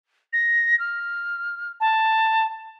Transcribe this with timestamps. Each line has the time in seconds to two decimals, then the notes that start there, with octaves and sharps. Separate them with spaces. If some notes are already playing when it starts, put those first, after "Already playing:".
0.33 A#6
0.79 F6
1.80 A5